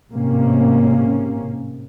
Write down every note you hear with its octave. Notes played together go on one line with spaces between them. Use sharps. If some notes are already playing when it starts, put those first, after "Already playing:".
A1 G#2 C3 A#3 C#4